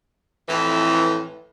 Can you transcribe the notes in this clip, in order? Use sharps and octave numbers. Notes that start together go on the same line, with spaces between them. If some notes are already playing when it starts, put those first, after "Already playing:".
F2 A2 E3